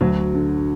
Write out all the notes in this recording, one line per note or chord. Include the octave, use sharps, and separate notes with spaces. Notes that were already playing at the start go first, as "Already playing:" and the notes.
D2 F#3
D3